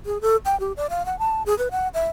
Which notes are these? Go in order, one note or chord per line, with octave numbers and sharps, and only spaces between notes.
G#4
A4
G5
G4
D5
F5
F#5
A5
G#4
B4
F#5
E5